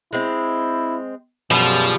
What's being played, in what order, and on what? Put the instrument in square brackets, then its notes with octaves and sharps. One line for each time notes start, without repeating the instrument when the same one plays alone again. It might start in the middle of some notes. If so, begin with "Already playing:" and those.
[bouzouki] G#3 C4 [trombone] E4
[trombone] F#2 [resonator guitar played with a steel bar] B2 [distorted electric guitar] F3 [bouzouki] G3 G#4